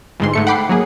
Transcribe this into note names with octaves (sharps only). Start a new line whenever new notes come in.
G1 G#2 C6
G#2 A3 C#7
F#5 G5 B5 D6 C7
F#3 A#3 G#4